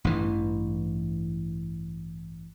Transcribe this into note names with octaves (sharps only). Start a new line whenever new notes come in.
A1 G2 E3